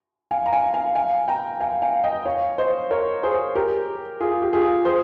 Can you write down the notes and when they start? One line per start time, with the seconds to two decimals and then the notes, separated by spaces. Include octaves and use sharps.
0.31 F5 G#5
0.46 A#5
0.53 F5 G#5
0.74 F5 G#5
0.95 F5 G#5
1.28 G5 A#5
1.60 F5 G#5
1.82 F5 G#5
2.04 D#5 G5
2.25 C#5 F5
2.58 C5 D#5
2.91 A#4 C#5
3.23 G#4 C5
3.55 G4 A#4
4.20 F4 G#4
4.42 G4
4.53 F4 G#4
4.85 G#4 C5